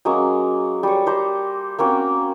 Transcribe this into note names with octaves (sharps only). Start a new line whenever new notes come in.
F#3 G#3 A#3 C#4
G3 C#5
G4 C5 A#5
A#3 C4 C#4 F#4